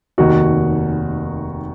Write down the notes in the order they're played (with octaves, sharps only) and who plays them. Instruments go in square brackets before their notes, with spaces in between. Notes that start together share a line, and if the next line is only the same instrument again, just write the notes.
[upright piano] F1 D#2 D#3 [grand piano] F#4